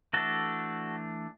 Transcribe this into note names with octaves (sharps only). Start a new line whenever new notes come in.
E3 A3 D4 F#4 A4